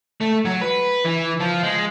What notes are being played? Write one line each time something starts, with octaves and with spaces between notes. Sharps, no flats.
A3
F#3
B4
E3
F3
G#3